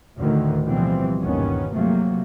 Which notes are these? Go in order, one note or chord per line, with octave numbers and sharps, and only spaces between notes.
D2 A2 D3 D#3
B2 E3 F3 G3 C4
G1 D#2 A#2 D#3 B3 C#4
C3 F3 F#3 A3 A#3